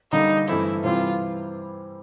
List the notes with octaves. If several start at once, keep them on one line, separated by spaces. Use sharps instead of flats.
D3 G3 A#3 D#4
G2 E3 A3 C4 E4
C3 E3 G3 C4 E4 F4